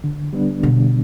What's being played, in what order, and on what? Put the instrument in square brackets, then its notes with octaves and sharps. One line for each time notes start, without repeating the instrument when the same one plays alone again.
[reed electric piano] D3
G3 B3 D4
[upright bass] B2 [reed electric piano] D3